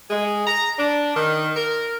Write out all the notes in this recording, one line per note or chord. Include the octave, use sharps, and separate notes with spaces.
G#3
A#5
D4
D#3
A#4